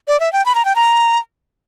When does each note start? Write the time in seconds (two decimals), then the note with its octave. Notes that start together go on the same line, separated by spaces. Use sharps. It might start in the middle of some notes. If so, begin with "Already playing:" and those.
0.08 D5
0.20 E5
0.33 G5
0.46 B5
0.55 A#5
0.65 G5
0.76 A#5